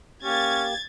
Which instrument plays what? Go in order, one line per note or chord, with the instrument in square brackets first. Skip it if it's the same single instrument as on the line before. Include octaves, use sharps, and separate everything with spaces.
[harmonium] A#3 G4 [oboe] C#4 [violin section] G#6 A6